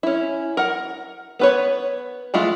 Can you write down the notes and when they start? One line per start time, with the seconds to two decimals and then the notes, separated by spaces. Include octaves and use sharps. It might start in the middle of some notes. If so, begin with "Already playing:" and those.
0.03 C#4 E4
0.57 A#4 F#5
1.39 B3 B4 C#5
2.34 E3 G#3 A3 F4